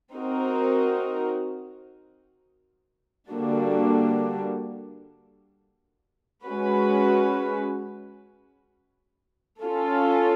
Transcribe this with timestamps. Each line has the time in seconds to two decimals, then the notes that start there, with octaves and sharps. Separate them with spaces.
0.14 C4 D#4 F#4 A#4
3.29 D3 G3 A#3 D4 F#4
6.46 G#3 C#4 F#4 B4
9.60 C#4 F4 A4